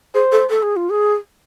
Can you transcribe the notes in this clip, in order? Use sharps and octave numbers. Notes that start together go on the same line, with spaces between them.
G#4 C5
A4
A4
G#4
F4
G#4